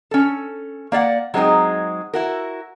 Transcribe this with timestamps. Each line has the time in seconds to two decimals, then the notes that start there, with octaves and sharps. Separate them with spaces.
0.11 C#4 A4
0.92 A#3 D5 E5 F#5
1.34 F#3 G#3 C4 D#4 G#4
2.14 E4 F#4 A#4